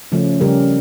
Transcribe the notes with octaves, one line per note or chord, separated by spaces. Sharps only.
C#3 F3 A3 C#4
C#3 G3 C#4 G4 A#4